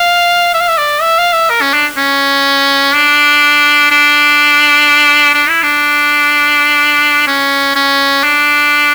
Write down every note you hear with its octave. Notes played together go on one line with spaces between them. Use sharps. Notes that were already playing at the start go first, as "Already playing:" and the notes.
Already playing: F5
E5
F5
E5
D5
E5
F5
E5
A#4
C#4
D4
C#4
D4
D4
D4
E4
D4
C#4
C#4
D4